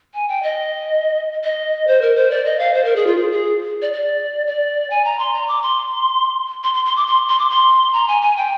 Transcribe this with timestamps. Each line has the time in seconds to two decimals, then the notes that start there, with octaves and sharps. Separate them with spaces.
0.14 G#5
0.28 G5
0.43 D#5
1.44 D#5
1.87 C5
2.02 A#4
2.16 C5
2.31 D5
2.45 D#5
2.59 F5
2.74 C5
2.85 A#4
2.96 G#4
3.07 F4
3.17 G#4
3.32 G#4
3.82 D5
3.93 D5
4.47 D5
4.90 G#5
5.05 A#5
5.19 C6
5.34 A#5
5.48 D6
5.62 C6
6.64 C6
6.74 C6
6.85 C6
6.96 D6
7.07 C6
7.28 C6
7.39 D6
7.50 C6
7.93 A#5
8.08 G#5
8.22 G#5
8.37 G5